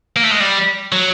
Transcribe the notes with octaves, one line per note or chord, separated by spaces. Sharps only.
A#3
A3
G#3
G3
F#3